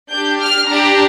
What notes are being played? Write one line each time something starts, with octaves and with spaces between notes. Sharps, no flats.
D4 G4 G6
F6
D4 G4 A#5